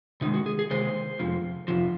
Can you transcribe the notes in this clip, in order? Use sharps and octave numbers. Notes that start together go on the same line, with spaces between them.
C3 D#3 G#3 D#4
F#4
G#4
G#4
C3 D#3 G#3 C5
F2 C3 F3
F2 C3 F3